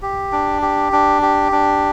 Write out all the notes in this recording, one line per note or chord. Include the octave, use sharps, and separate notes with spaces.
G4
D4
G4
D4
G4
D4